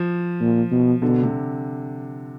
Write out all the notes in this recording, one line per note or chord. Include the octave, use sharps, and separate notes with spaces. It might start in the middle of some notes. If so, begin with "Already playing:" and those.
Already playing: F3
A#2
B2
B2 D3
C3